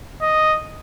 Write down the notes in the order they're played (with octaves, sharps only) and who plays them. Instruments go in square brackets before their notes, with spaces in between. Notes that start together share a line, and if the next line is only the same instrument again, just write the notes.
[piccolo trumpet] D#5